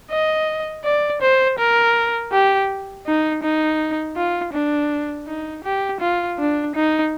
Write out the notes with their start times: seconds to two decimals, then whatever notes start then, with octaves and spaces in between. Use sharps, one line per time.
0.11 D#5
0.84 D5
1.22 C5
1.58 A#4
2.32 G4
3.06 D#4
3.43 D#4
4.16 F4
4.53 D4
5.27 D#4
5.64 G4
6.00 F4
6.38 D4
6.75 D#4